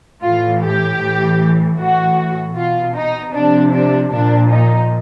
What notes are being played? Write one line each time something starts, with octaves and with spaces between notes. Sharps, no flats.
A2 E3 F4
G4
A2 E3
A2 E3 F#4
B2 F4
D#4
C3 F3 D4
D4
A#2 F3 D4
D#4